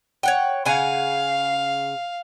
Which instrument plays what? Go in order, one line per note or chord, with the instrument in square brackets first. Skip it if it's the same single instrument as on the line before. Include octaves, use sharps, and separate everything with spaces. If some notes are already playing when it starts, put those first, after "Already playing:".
[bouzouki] C#5 F#5 G5
[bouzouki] C#3 F#5 G#5 [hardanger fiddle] F5